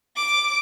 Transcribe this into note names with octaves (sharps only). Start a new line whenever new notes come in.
D6